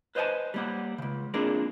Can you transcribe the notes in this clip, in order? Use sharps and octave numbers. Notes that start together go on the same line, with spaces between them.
B4 C5 D#5 E5 G#5 A5
G3 A#3 F#5
C#2 C#3
A#3 C4 D4 F4 G#4 A#4